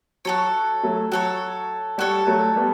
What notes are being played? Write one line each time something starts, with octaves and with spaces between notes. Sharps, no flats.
F#3 F#4 A4 C#5
F#3 A3
F#3 F#4 A4 C#5
G3 F#4 A4 C#5
F#3 A3
G3 B3